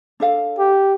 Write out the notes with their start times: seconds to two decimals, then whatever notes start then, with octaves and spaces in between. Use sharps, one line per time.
0.20 D4 A4 F5
0.58 G4